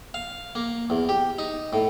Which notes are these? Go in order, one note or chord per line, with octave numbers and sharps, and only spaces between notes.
F5
A#3
E2
G4
D#4
A2